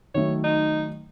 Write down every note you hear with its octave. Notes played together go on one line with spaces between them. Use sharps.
D#3 F#3 A3 C#5
D#4